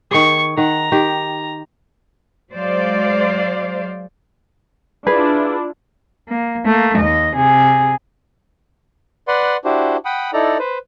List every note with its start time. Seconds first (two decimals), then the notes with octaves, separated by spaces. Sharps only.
0.11 D#3 G#4 C#6
0.57 D#3 F#5 A#5
0.92 D#3 G4
2.52 F#3 G#3 C5 D5 F5
5.07 D4 E4 F4 G#4 B4
6.28 A#3
6.65 A3 A#3
6.97 D#2 D#5
7.35 C3 G#4
9.28 B4 D5 F#5 C6
9.65 D4 E4 F#4 G4 C5
10.05 F#5 G5 B5 D#6
10.33 D#4 E4 A4 D5 A#5
10.59 B4 C5